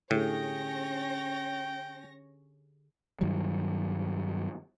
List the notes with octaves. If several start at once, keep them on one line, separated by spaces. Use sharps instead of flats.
A2 D3 C#4 G4 G#4 C#5 G5 A#6
G2 D#3 F#3 G3